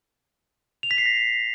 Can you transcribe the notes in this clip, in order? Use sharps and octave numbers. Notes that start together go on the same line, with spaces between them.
F7
B6
C7
A#6